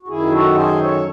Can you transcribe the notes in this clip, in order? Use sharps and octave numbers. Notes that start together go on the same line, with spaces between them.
F#4
F#2 D#3 E4 G#4
F#4 A4
G#4 C5
A4 C#5